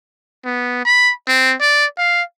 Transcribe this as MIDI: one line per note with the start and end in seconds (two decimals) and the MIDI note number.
0.45 0.85 59
0.85 1.12 83
1.28 1.55 60
1.61 1.85 74
1.98 2.22 77